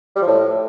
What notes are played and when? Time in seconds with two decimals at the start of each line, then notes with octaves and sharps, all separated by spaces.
0.16 G3
0.22 F3
0.27 A2